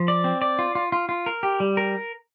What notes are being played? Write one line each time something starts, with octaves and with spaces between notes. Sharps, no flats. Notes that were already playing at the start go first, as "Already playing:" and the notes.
Already playing: F3
D5
C4
D5
F4
F4
F4
F4
A#4
G4
G3
A#4